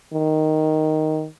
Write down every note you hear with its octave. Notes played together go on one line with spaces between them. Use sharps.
D#3